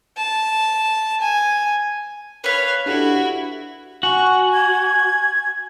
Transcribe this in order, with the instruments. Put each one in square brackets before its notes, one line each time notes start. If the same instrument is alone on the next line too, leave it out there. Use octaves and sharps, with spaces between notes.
[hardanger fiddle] A5
G#5
[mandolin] B4 B5 [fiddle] C#5 F5
[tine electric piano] D4 G4 A4 [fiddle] E4 F#4
[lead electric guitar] F#4 [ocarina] G#5 [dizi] C#6
[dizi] G#6